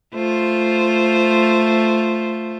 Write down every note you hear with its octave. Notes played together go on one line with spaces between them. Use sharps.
A3 F4 C5